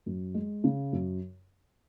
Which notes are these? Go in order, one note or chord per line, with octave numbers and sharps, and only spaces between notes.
F#2
G#3
C#3
F#2